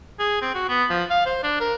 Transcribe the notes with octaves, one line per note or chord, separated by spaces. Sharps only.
G#4
C4
F#4
B3
F3
F5
C5
D4
A#4